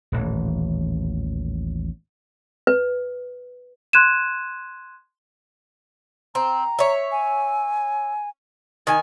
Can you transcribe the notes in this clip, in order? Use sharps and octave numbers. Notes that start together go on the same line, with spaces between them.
D#1 A1 E3
B4
C6 F#6 G#6 D#7 E7
C4 A#5
C#5 E5
G#5
D#3 D#4 G#5